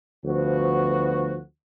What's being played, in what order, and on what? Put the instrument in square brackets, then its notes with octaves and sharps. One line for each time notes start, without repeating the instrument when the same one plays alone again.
[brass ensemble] D2 F3 B3 F#4